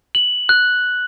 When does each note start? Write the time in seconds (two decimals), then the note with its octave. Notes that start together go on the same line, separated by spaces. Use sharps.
0.15 F#7
0.49 F#6